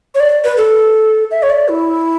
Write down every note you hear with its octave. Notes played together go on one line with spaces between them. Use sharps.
C#5
D5
B4
A4
E5
C#5
D5
E4